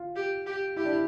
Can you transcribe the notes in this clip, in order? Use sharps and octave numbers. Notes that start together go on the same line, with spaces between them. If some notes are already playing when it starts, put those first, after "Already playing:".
Already playing: F4
G4
G4
E4 G4
D4
E4